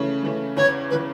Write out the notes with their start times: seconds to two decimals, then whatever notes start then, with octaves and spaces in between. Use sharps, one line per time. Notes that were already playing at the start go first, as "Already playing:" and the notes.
Already playing: C#3 E3 A3 C#4
0.23 C#3 E3 A3 C#4
0.57 E2 C#3 E3 C#5
0.90 C#3 E3 B4